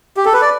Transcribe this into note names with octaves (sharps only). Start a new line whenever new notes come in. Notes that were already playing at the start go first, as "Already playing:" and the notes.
G4
A4
B4
D5